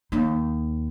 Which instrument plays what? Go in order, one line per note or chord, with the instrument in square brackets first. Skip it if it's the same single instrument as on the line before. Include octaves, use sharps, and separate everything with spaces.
[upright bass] D#2 D#4